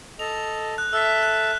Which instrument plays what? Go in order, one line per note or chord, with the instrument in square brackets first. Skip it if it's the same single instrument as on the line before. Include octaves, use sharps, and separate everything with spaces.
[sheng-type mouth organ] A4 D#5 [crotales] F7
[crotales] F#6
[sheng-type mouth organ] A4 E5 [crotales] E6 F6 B6
[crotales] F#6